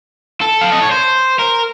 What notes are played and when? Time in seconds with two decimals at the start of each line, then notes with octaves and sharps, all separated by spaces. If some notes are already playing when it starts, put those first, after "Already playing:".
0.41 A4
0.61 F5
0.72 D#5
0.82 C#5
0.91 C5
1.39 A#4